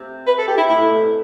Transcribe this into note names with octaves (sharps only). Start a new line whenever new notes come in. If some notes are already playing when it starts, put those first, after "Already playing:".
Already playing: C3
B4
A4
G4
E4
A2 E4
B2
C3